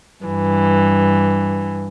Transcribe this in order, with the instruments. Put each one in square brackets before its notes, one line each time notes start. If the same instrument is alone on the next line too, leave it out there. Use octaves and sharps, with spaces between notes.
[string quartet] G2 E3